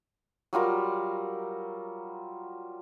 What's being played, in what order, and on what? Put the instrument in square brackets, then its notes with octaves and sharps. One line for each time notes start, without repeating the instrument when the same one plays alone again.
[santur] F#3 G3 F4 A#4